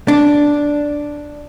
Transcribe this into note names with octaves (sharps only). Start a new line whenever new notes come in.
D4